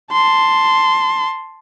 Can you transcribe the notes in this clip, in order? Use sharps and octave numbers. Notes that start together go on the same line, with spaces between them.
A5 C6